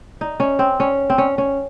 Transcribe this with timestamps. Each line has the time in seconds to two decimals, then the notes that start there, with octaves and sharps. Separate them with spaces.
0.21 D#4
0.40 C#4
0.59 C4
0.80 C#4
1.10 C4
1.18 C#4
1.38 C#4